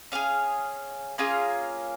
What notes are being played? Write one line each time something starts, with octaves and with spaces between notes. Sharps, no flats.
C#4 G#4 F5
A#3 C#4 F4 G#4